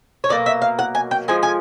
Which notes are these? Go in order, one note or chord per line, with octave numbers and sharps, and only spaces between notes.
C#5
B2 F#3 A#3 D5
E5
F5
F#5
G#5
G5
F3 G#3 G#5
G#5